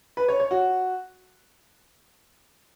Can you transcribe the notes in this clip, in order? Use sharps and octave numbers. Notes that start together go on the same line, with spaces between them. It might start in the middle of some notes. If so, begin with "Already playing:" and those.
B4
C#5
C#5
F#4